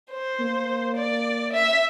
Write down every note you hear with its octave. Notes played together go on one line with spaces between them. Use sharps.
C5
A#3
D5
E5